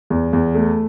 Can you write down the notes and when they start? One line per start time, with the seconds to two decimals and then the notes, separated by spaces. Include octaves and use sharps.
0.10 E2
0.33 E2
0.54 A3